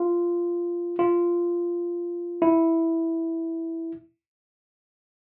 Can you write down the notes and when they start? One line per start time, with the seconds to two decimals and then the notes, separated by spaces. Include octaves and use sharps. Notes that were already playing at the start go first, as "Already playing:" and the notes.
Already playing: F4
0.99 F4
2.42 E4